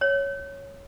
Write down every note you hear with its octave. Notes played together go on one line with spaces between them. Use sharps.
C#5